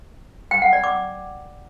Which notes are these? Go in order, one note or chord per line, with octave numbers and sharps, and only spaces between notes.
G5
F#5
D5
D6